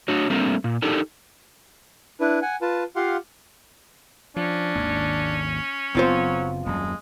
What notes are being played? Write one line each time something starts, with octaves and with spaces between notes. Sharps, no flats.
A2 D4 F#4 C#5
G3 A3 A#3 C4 D4
A#2
D4 D#4 G4 A4 A#4
D4 E4 B4
F#5 G#5
F4 B4 A5
F4 G4 F5 F#5 C6
F3 C#4 D4
G#1 D#2
F#1 F#3 B3 C4 F4 C5
D#1 F#2 G#3